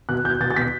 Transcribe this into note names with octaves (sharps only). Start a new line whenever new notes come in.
B2 F#6
B2 G6
B2 A6
A6
B2 B6